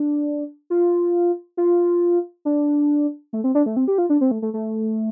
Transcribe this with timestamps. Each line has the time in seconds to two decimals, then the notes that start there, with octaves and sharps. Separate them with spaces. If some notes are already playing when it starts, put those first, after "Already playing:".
Already playing: D4
0.70 F4
1.57 F4
2.45 D4
3.33 A3
3.44 C4
3.55 D4
3.66 A3
3.76 C4
3.88 G4
3.98 F4
4.10 D4
4.21 C4
4.31 A3
4.42 A3
4.54 A3